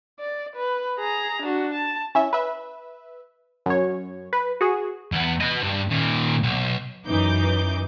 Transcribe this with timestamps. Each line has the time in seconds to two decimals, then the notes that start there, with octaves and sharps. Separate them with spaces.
0.19 D5
0.56 B4
0.99 G#4 A#5
1.42 D4 F#4
1.74 A5
2.15 C#4 E4 E5
2.33 B4 E5
3.66 F#2 C#5
4.33 B4
4.61 F#4 G#4
5.12 E2 B3
5.41 B4 D#5
5.63 G2
5.91 A#2 D#3
6.43 B1
7.08 F#2 E3 D#4 D6 G6